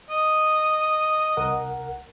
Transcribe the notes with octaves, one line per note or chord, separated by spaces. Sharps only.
D#5
C2 A#4 F#5